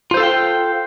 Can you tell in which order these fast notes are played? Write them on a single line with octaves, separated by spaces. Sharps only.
F4 C5 A4 F5 G5